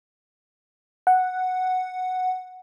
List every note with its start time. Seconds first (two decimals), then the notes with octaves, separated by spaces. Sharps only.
1.07 F#5